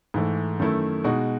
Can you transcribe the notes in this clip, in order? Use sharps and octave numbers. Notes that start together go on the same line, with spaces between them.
G#2 E3 A3
F#2 D#3 A3 E4
B2 G#3 D#4 F#4